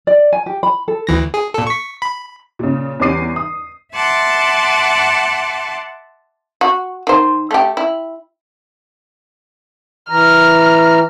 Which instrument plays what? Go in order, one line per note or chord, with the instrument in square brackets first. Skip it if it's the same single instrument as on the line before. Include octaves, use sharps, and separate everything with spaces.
[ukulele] D5
G#5
G4
B5
A4
[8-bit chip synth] D2 E3 A#6
G#4
A#2 A4
C#6 B6
B5
[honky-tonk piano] A#2 C#3
E2 G3 C#4 D6 C7 D#7
D#6
[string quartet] E5 F#5 A5 C6 D6
[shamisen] F#4
D#3 C5
A3 G4
E4
[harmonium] E3 A#5 [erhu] F6